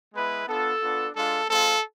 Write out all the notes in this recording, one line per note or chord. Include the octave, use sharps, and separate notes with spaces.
G#3 B3 E4 B4
B3 D4 F4 A4
B3 D4 F4
G#3 D4 F4 A4
G#3 C4 F4 A4